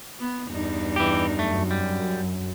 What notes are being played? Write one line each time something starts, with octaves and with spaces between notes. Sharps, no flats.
B3
E2 G2 D#4
E3 G4
F#2 A3
G3